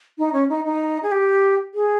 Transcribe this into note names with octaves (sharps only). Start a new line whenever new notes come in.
D#4
C#4
D#4
D#4
G#4
G4
G#4